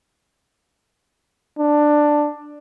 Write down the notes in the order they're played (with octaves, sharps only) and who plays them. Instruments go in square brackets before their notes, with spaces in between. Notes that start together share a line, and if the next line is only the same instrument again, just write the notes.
[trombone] D4